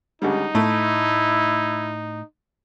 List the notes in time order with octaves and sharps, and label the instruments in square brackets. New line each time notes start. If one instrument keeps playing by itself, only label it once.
[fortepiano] C#2 D3 G3 [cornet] D#4
[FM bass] A2 [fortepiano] A3 [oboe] E4